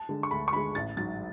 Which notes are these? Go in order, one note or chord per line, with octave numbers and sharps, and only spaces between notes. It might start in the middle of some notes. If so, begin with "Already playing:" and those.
Already playing: A5
D3 G#3
C#6
D2 B5
C#6
D3 G#3 B5
A1 A6
G#2 F#3 A6